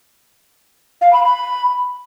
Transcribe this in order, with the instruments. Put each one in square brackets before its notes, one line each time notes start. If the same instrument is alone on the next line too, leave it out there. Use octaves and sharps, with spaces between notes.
[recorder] F5
B5
B5